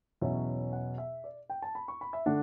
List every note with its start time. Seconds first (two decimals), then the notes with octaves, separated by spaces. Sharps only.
0.21 E2 B2 F#3 C#4 E5
0.73 F#5
0.98 E5
1.24 D5
1.50 G5
1.62 A5
1.75 B5
1.88 C#6
2.01 B5
2.13 E5
2.26 D3 A3 D4 F#5